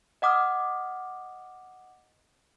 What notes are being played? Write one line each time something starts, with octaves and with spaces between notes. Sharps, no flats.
D#5 F#5 D6 D#6 F6